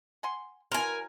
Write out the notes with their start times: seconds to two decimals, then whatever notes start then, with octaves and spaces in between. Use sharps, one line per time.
0.23 F#5 G#5 C6
0.72 E3 F#3 A#4 G#5 C6